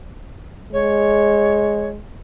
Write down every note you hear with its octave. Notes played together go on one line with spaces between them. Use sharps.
G#3 C#5